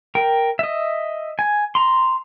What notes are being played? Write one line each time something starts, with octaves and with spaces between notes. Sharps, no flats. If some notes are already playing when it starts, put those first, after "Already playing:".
A#4 G5
D#5 E5
G#5
A#5 C6